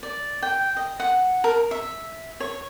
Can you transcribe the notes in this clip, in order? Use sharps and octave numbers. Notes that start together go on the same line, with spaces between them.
D5
G5
D#5
F#5
A#4
E5
C#5